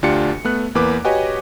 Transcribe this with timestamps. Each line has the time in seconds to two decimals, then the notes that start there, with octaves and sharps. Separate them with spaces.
0.03 D2 D4 F4 G4 C#7
0.45 A3 B3 F#6
0.75 E2 A#3 B4 D6
1.05 F#4 G4 B4 C#5 D#5 G#5